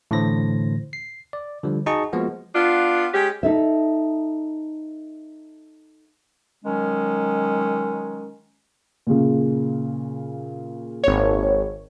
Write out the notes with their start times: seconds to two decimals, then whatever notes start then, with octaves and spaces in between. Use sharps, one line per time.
0.11 A2 D3 E3 C5 A#6
0.93 C7
1.33 D5
1.63 D3 F3 G3
1.86 D#4 F#4 G#4 D#5 A5 C#6
2.13 F3 G#3 A#3 B3 F#4
2.55 B3 D4 F4
3.14 G#3 C#4 G4
3.43 D#4 A4 E5
6.65 D#3 F#3 G#3 C#4
9.07 A#2 C#3
11.04 G#1 C#5